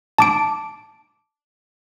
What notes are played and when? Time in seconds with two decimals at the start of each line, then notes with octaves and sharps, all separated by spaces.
0.18 A5 D6 D7